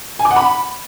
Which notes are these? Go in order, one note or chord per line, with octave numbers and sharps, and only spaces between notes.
G#5
D6
F#5
B5